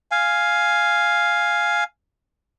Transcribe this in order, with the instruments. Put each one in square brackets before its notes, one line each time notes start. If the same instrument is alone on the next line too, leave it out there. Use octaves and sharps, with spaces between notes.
[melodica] F5 G#5